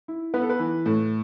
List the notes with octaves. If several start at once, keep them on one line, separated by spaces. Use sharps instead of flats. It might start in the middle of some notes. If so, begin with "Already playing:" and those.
E4
B3 B4
A4
B4
E3
A2